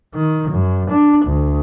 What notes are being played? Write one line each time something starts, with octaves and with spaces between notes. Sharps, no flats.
D#3
F#2
D4
D2